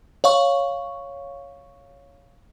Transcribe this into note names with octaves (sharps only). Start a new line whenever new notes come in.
C#5 F5 C#6